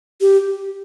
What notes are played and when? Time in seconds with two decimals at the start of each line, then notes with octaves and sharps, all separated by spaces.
0.21 G4